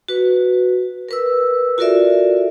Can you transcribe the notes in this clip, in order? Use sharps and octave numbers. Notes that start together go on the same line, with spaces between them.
F#4 B4
A#4 B4 E6
F4 F#4 A4 A#4 D5 E5